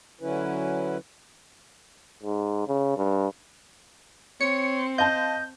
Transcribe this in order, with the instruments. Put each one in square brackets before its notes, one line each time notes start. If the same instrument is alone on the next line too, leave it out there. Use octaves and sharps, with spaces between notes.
[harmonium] D3 F#3 C#4 E4 B4
[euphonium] G#2
C#3
G2
[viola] C4 [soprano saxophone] C#5 [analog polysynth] C#7
[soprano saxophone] D#5 [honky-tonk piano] F5 A5 [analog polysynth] G6